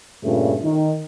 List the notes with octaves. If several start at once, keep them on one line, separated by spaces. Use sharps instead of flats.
G2 A#2 C#3 A3
D#3